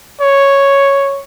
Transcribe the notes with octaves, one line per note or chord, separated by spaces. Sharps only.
C#5